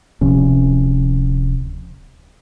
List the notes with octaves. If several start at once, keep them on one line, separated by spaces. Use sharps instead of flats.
D1 C3 F3 C#4